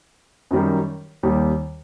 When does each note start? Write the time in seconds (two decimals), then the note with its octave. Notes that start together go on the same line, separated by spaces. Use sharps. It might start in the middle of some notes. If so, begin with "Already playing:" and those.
0.51 F#2 D#3 G3
1.23 D#2 D#3 G3